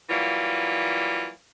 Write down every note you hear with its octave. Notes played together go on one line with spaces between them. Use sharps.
E3 F#3 G3 A#3 F4